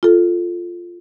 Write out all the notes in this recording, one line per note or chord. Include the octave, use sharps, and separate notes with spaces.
F4 A4